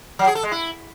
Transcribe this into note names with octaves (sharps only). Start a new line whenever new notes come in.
F#3
G#4
A4
G#3
E4